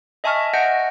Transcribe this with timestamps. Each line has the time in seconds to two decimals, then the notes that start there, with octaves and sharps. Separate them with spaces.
0.24 D#5 E5 G#5 A5 C#6 F6
0.54 D#5 F#5 G6 A#6 C#7 D7